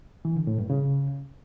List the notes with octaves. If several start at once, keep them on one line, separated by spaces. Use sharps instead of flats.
E3
D3
A2
G2
C#3